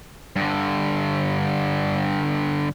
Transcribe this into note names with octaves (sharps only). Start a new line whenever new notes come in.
G2 D3